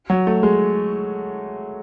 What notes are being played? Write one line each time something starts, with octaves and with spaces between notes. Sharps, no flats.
F#3
A3
G#3